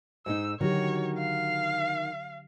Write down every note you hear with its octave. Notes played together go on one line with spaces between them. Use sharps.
G#2 G#3 D#4 E6
D3 D#3 F#3 F#4 G4 C#5
F5